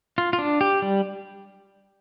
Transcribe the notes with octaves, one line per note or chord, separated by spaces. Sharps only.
F4
F4
D4
G4
G3